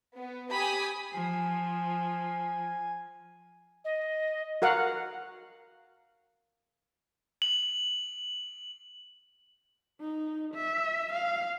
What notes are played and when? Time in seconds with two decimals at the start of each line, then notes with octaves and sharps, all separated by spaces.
0.17 B3
0.53 G4 G#5 B5 D#6
1.13 F3 G#5
3.84 D#5
4.62 F#4 A#4 F5 F#5
7.42 F#7
10.01 D#4
10.55 E5
11.13 F5